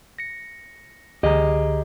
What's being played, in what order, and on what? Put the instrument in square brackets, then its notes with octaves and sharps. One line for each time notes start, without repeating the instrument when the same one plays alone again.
[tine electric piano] A#6 C#7
[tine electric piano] C#2 D3 A#5 [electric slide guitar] G4 G#4 D#5